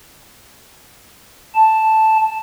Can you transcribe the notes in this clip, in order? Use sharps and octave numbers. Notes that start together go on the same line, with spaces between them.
A5